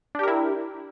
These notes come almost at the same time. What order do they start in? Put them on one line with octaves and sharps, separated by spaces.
D4 G4 A#4 E4